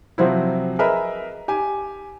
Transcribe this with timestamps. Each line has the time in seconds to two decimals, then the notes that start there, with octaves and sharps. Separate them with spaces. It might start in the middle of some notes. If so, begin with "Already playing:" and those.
0.18 C3 F3 F#3 C4 E4
0.79 G#4 A#4 B4 D#5 E5 B5
1.48 G4 G#5